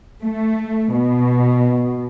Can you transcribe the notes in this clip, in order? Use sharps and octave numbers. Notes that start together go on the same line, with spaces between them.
A3
B2